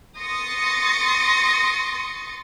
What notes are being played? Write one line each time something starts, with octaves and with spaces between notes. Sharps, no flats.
C6 C#6 D#6 A6 A#6 C#7